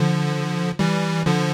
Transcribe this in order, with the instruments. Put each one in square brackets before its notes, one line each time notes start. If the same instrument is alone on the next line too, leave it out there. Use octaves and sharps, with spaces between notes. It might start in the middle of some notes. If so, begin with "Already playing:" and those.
Already playing: [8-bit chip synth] D3 F3
E3 G3
D3 F3